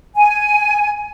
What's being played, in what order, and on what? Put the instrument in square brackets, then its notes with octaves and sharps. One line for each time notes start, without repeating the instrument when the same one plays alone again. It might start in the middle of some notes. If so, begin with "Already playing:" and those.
[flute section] G#5